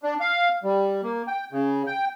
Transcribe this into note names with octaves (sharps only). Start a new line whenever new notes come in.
D4
F5
G3
A#3
G5
C#3
G5